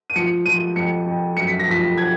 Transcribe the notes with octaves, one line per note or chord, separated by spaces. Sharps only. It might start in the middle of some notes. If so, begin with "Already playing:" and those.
D#7
F3 C#7
F3 D#7
F2 C#7
F2
F#2 C#7
B6
A#6
F3 B6
G#6